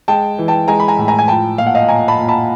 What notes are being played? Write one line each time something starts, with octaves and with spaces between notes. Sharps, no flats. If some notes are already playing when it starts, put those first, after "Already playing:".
G#3 G5 A5
E3
G5 A5
G#3 G#5 A#5
B5
G#5 A#5
A2
G#5 A#5
G#5
F3 G5 A5
A#2 F5
F#5
D#5 F5
A#2 G#5 A#5
A5 B5
A#2
A5 B5